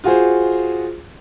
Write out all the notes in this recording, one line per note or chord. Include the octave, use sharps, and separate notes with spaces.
F4 F#4 G#4 C5